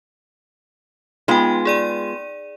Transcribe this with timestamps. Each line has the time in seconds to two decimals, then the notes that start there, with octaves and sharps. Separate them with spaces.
1.28 G#3 B3 D#4 F4 G5
1.65 G#4 D5 D#7